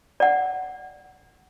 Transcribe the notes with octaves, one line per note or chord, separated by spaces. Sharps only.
D5 F#5